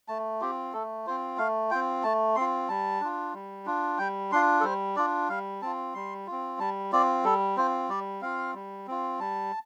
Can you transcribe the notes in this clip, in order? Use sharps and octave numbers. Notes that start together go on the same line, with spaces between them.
A3 A5
C4 F4 G4
A3 A4
C4 F4 C5
A3 F5
C4 F4 G5
A3 A5
C4 F4 C6
G3 A5
D4 F4
G3
D4 F4
G3 G5
D4 F4 C6
A4
G3 C5
D4 F4 D5
G3 F5
C4 F4 A5
G3 C6
C4 F4
G3 A5
C4 F4 D5
G3 A4
C4 F4 C5
G3 D5
C4 F4 F5
G3
C4 F4
G3 A5